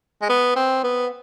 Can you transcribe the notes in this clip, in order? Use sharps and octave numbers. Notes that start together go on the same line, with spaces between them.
G#3
B3
C4
B3